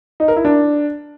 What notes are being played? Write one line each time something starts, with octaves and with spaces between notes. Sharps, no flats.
D#4
A#4
E4
D4